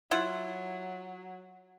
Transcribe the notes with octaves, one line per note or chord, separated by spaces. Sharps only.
F#3 E4 F4 F#5